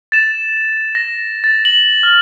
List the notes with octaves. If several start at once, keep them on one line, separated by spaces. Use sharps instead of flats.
A6 E7
A#6
A6
F#7
F6